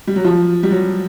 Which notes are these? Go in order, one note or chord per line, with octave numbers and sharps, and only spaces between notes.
G3
F#3
F3
G3
F#3